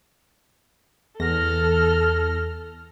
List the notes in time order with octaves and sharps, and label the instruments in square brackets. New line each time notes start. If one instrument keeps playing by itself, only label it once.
[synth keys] E2 A#6 [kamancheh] A4 F6